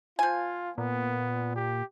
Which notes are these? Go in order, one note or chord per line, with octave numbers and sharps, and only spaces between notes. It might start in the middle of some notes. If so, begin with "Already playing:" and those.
F3 F4 G#5
A#2 B3
G4